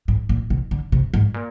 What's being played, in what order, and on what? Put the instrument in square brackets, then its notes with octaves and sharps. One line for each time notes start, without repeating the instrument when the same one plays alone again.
[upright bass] G#2
A#2
C3
D3
C3
G#2
A#2